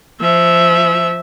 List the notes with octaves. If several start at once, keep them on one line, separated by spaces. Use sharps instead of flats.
F3 E5